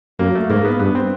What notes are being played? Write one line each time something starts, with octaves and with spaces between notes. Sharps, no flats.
F#2 A#3
A3
G#2 A#3
B3
G2 B3
C4